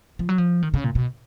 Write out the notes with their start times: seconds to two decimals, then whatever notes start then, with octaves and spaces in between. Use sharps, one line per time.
0.19 F3
0.29 F#3
0.38 F3
0.62 D#3
0.74 C#3
0.84 A#2
0.95 B2